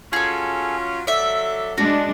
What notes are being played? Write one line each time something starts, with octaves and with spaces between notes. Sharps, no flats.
F#3 C#4 F4 G#4 A4
F#3 A4 D5 E5
G#3 D4 F#4